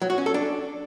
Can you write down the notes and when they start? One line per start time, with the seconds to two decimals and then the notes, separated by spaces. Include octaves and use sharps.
0.02 F#3
0.10 F#4
0.18 C#4
0.26 A4
0.34 D4